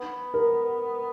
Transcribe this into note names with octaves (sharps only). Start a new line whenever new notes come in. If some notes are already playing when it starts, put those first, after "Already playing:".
Already playing: B3
A#4